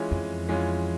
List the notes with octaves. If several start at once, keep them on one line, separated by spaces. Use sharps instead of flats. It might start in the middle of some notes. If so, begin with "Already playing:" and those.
Already playing: E3 G#3 C#4 F4
F2
E3 G#3 C#4 F4